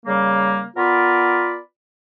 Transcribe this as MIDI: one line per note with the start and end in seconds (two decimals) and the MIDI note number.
0.05 0.62 49
0.05 0.62 55
0.05 0.62 58
0.77 1.58 59
0.77 1.58 65
0.77 1.58 70
0.77 1.58 74
0.77 1.58 83